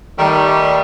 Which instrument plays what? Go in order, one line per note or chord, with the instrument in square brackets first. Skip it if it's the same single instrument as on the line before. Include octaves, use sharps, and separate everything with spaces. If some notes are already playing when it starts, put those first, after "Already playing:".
[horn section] D#3 G3 A3